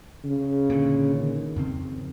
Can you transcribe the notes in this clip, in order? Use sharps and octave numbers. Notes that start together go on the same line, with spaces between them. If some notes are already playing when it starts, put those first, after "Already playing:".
C#3
A#2 D3
D#3
F2 C#3 C4